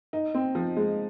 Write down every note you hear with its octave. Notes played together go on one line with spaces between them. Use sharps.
D#4
C4
F3
G#3